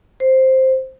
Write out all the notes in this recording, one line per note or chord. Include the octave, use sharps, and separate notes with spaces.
C5